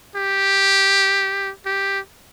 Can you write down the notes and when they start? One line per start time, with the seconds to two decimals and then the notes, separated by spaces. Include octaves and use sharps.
0.16 G4
1.66 G4